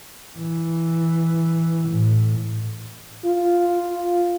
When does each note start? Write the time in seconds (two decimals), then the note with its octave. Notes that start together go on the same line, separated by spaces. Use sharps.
0.38 E3
1.88 A2
3.26 F4